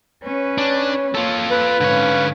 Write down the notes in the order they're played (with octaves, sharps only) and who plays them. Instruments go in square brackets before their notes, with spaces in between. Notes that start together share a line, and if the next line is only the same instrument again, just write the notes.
[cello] C#4 B4 [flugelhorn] C#5
[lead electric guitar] D4
[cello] A#3 [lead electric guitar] F4 A4
[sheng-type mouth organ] B4
[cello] G#2 C#4 [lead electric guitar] D3 C#5 [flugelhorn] F5